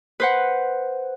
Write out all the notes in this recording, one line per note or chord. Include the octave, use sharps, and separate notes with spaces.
B4 C5 F#5